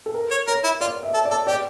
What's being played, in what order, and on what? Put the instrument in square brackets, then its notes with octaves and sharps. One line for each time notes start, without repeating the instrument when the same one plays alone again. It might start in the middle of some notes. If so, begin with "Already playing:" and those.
[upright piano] A4
A#4
[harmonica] C#5
[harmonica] A#4 [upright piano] C#5
[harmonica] E4
[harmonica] F4 [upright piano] D5
[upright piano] E5
[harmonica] A4
[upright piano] D5
[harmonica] A4
[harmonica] G4 [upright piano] D5